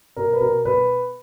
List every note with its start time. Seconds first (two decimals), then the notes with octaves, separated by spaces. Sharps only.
0.16 B2 A#4
0.33 B4
0.41 B2 A#4
0.65 B2 B4